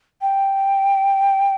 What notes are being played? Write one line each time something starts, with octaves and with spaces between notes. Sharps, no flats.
G5